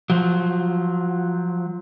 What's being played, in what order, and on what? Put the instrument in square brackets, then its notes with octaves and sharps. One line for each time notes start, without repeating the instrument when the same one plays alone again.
[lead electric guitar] F3 F#3